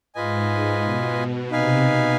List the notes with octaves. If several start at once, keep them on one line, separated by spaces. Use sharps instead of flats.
G#2 F4 B4 D#5 G#5
G#2
B2
B2
C3 D#4 B4 F5 G#5
B2